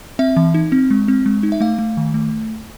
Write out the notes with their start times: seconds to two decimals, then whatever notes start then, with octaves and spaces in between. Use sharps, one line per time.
0.19 C4 E5
0.37 E3
0.54 D#4
0.72 C4
0.90 G#3
1.08 C4
1.26 G#3
1.43 D#4
1.52 E5
1.61 A3 F5
1.78 A3
1.97 D#3
2.14 A3